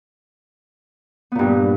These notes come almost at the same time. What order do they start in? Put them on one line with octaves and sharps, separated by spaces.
B3 A#2 G2